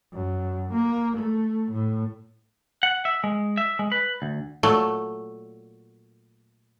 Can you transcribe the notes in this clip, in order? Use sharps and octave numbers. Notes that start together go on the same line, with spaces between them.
F#2
A#3
A3
A2
F#5
E5
G#3
E5
G#3
B4
D2
A#2 F#3 A3